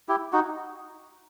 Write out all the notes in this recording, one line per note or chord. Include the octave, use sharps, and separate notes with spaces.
E4 G4
D#4 F#4